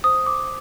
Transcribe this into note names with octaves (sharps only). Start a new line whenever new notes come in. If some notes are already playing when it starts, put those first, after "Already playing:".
C5 D#6
D6